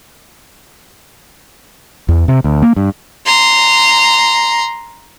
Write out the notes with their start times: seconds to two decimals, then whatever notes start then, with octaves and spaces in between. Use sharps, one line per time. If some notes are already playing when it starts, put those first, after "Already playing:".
2.09 E2
2.28 C3
2.44 D2
2.62 A#3
2.76 G2
3.26 A#5 C6